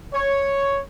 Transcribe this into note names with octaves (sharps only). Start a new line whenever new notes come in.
C#5